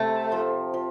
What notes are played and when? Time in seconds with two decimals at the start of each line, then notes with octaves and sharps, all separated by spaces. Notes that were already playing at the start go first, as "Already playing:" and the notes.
Already playing: C3 A3
0.32 F3
0.74 F3